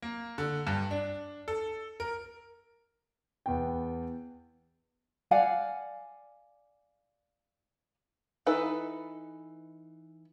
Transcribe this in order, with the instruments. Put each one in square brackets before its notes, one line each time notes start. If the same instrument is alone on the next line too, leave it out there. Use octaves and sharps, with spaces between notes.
[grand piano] A#3
D3
G2
D4
A4
A#4
E2 B3 G5
[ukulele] D5 F5 F#5 G#5
[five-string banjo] E3 D#4 A4 B4